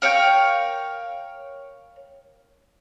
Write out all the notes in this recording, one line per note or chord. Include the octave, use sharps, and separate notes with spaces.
A#4 C#5 F5 G5